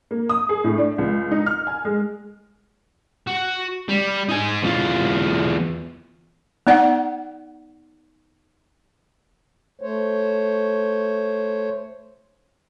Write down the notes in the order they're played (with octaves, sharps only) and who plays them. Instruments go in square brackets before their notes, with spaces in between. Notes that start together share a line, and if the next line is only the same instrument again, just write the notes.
[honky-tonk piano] A#3
D#6
G#4
A2
D4
C#2
D#4
F6
G#5
G#3
[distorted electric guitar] F#4
G3
D#4 G#5
E2 F4
[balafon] B3 D#4 D5 F#5
[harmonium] A3 C5 C#5